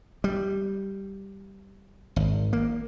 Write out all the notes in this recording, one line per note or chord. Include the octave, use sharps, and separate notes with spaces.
G3
G#1
A#3